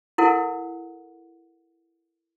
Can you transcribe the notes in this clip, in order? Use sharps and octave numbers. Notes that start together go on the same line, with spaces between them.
E4 A4 A#4 F#5